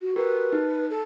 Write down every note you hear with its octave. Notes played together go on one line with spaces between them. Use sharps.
F#4
F#4 G4 A#4 B4
D#4
A4